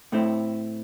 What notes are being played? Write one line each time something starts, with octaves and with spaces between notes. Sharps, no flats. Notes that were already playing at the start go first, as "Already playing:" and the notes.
A2 A3 C4 E4